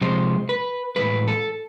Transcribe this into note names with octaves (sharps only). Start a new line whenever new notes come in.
C3 F3 G#3 C5
B4
A2 E3 G#3 B4
A4